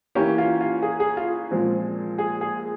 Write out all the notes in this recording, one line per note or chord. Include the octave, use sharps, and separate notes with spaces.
E3 A#3 C#4 G4
F4
F4
G#4
G#4
F4
A#2 F3 G#3 C4
G#4
G#4